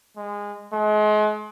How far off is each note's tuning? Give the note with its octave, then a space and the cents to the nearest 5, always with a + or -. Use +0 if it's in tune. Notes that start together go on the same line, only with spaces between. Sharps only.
G#3 -20
G#3 +35